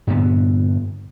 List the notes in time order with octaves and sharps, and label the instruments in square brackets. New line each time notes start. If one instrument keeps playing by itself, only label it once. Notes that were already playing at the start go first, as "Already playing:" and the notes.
[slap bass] G2 A#2 D3 B3